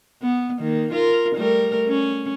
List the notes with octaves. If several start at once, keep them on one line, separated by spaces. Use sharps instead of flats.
B3
D#3 A#3
F4 A#4
G3 A3 A#4
C#4